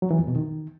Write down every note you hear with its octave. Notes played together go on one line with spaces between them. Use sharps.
F#3
E3
F2
B2
D#3